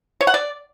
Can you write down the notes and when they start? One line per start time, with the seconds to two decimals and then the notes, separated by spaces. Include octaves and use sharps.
0.21 C#5
0.27 F#5
0.34 D5